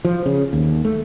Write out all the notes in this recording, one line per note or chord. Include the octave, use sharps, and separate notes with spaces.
F3
C#3
D#2
A3